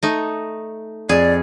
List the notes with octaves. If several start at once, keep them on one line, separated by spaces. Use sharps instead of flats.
A3 D#4
F2 G#4 D5